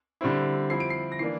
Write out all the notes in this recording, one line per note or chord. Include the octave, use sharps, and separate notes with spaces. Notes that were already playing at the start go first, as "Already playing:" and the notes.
D3 G3 C4 E4
F3 C4 E4 C7
D7
C7
A#6
E3 A#3 D4 C7